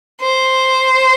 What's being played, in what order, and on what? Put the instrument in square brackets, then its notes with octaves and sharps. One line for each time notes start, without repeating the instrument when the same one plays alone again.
[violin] C5